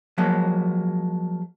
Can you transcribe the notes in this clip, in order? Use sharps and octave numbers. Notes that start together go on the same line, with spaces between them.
F3 F#3 G#3 A#3